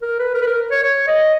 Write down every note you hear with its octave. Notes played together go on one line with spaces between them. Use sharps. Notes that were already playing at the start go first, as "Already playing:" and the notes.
A#4
B4
A#4
B4
A#4
C#5
C#5
D#5